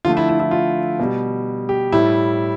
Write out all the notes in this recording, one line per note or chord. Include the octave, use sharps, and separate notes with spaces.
D3 F3 A3 F4
E4
E4
E4
F4
B2 G3
G4
A2 G3 E4